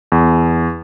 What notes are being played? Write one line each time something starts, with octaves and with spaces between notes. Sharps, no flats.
E2